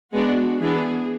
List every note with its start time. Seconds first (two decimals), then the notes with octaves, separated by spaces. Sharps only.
0.12 G#3 B3 D4 F#4
0.60 E3 B3 D4 G#4